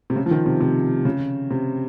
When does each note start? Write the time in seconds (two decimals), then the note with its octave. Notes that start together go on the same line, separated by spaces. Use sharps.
0.10 C3
0.16 C#3
0.26 F3
0.31 D#3
0.46 C3
0.60 C3
1.05 C#3
1.50 C3